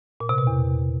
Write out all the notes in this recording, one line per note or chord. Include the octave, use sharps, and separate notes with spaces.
A#2
C3
B2
E2